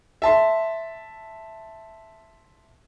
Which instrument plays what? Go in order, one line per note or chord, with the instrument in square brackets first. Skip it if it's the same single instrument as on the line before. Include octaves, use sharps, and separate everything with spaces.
[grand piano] E5 A5 C6